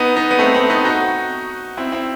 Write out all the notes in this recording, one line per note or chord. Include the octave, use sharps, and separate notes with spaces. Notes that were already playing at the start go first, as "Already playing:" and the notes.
Already playing: B3 D#4
B3 D#4
B3
A3 C4
A3 C4
B3 D#4
D#4 F#4
C4 E4
C4 E4